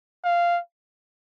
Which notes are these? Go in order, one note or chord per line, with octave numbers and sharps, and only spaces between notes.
F5